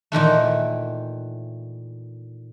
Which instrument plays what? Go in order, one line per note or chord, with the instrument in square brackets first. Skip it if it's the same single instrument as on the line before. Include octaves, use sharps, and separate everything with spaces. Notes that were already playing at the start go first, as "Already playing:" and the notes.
[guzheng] A#2 D#3 E3 A3